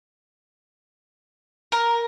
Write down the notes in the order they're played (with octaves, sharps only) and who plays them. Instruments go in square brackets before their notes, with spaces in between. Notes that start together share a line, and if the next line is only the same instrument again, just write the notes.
[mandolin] A#4